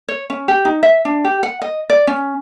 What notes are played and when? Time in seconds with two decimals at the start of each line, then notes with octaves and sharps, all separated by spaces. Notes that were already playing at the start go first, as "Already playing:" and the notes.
0.08 C#5
0.30 C#4
0.48 G4
0.65 D#4
0.83 E5
1.05 D4
1.24 G4
1.43 F#5
1.62 D#5
1.90 D5
2.07 C#4